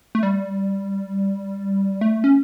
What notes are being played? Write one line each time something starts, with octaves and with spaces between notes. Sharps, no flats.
A3
G3
A3
C#4